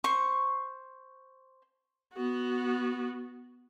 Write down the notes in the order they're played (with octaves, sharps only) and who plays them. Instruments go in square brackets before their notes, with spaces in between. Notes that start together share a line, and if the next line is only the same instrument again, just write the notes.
[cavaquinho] C5 C#6
[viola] B3 F#4